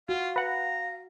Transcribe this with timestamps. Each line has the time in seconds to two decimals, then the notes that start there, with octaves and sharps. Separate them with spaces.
0.09 F4 F#4 F5
0.36 B4 F#5 A#5